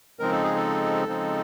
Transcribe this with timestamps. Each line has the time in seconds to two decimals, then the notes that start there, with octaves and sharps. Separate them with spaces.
0.19 C#3 F3 G#3 C4 D#4 A#4
0.31 A4
0.44 G#4
0.55 A4
1.08 C#3 F3 G#3 C4 D#4